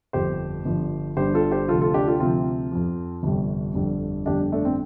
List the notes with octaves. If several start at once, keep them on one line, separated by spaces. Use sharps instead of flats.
G1 F2 F3 G4 C5
G1 G2 F3
G1 G2 D3 G4 C5
F4 A4
G4 C5
D2 C3 F3 F4 A4
F4 A4
D4 G4
F4 A4
D2 C3 F3 C4 F4
F2 F3
G1 F2 C3 G3
G1 F2 D3 G3
G1 F2 D3 G3 D4 G4
A3 D4
C4